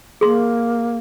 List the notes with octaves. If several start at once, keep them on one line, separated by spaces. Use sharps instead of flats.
A#3 G#4 C6